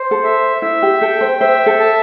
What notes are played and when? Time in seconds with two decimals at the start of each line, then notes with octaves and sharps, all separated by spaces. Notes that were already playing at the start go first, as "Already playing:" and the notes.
Already playing: C5
0.11 A4
0.24 E5
0.62 E4 E5
0.82 G4
1.01 A4 G5
1.21 C5
1.40 C5 E5
1.66 A4
1.80 A5